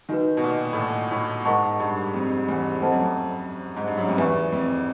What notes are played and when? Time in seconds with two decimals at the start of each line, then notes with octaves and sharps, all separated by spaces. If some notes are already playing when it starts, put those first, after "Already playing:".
0.09 D#3 D#4 F#4 B4
0.37 B2
0.44 A#2
0.73 A2
0.78 A#2
1.11 A2
1.45 G#2 A#4 D#5 F#5 A5 C#6
1.80 G2
2.14 F2
2.48 E2
2.82 F2 A4 C5 D#5 F#5 A5
2.92 F#2
3.02 F2
3.76 G#2
3.87 G2
3.98 F#2
4.08 F2
4.18 E2 B4 E5 G#5 C#6
4.52 F2